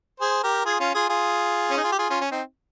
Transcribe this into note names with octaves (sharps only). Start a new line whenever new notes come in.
G#4 C5
G4 A#4
F4 G#4
C#4 F4
F4 G#4
F4 G#4
C#4
D#4
F4
G4
F4 G#4
C#4 F4
C#4
C4 D#4